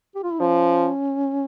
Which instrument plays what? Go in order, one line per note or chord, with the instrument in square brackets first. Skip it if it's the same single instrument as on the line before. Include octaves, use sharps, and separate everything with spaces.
[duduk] G4
F4
E4
[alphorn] F3 [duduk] C#4